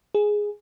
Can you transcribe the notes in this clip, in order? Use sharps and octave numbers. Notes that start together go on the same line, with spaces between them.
G#4